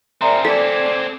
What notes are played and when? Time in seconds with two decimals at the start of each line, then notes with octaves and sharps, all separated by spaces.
0.21 C4 G#4 A#4 D5 E5 A#5 C6
0.45 A4 D5 D6 G#6 B6